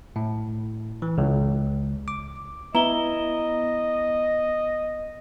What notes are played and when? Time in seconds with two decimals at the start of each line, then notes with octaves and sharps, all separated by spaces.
0.16 A2
1.02 E3
1.18 C#2
2.08 D6
2.75 B3 E4 D#5 A#5 G7